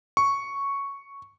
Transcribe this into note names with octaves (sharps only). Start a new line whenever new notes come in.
C#6